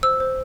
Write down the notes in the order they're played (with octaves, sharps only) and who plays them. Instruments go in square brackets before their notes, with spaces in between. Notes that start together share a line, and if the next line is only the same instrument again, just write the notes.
[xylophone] C5 E6
C5